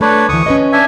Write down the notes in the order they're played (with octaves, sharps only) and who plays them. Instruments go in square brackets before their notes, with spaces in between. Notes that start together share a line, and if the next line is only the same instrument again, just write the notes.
[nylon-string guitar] A3 [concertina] D4 B4 C#5
[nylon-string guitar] D2 E3 [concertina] C#6 D#6
[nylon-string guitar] C#4 B4 D#5
[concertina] D4 E5 G#5